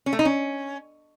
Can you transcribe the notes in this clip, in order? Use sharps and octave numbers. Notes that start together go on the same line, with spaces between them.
C#4
A3
D#4
C#4